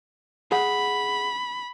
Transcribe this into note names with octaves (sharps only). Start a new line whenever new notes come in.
G#4 F#5 B5